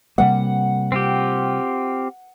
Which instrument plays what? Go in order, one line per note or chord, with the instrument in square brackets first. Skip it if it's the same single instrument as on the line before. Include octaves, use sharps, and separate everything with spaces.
[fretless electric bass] C3 G3 A#3 [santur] F#5
[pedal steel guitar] C4 F4 G4